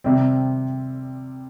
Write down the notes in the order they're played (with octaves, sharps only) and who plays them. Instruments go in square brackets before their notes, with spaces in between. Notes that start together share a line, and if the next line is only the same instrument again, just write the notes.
[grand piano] C3 G3 C4